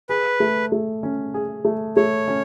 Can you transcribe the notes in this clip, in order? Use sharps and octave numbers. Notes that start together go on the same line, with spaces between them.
G#4 B4
A3
A3
C#4
G#4
A3
A3 C#5
C#4